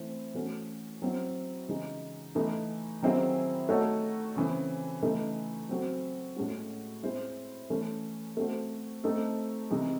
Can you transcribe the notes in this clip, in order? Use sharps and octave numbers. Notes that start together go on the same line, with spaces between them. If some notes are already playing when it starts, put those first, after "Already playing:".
Already playing: E3 A3 C4 E4 C5
E3 A3 C#4 F#4
F#3 C4 E4
C#3 E3 G#3 D#4
E3 A3 D#4
D#3 F#3 C4 E4 G#4
A3 D#4 F#4 A4 C#5
C#3 E3 C4
C#3 E3 A3 D#4
F#3 C4 F#4
A2 G#3 C#4 F#4
G#3 C4 E4 G#4 C5
E3 A3 C#4
A3 C4 F#4 C5
A3 C4 D#4 A4
C3 E3 G#3 D#4